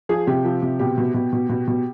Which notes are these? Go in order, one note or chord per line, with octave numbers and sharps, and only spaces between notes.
F3 G#4
C3 G4
F3
C3
B2 G4
B2
B2
B2
B2
B2